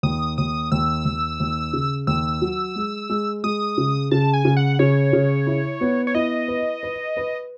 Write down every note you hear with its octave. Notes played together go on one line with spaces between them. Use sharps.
D#2 D#6
D#2 D#6
D#2 E6
D#2
D#2
C#3
D#2 E6
F#3
G#3
G#3
G#3 D#6
C#3
C#3 A5
G#5
C#3
F#5
C#3 C#5
C#3
E4
B3
C#5
E4 D#5
B4
B4
B4